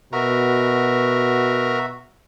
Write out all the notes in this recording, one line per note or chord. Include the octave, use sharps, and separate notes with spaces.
B2 F#4 A#4 E5